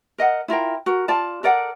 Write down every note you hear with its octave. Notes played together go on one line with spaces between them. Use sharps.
A#4 D#5 F#5
E4 F4 A#4 G5
F#4 A#4
F4 D5 A5
A4 A#4 D5 F#5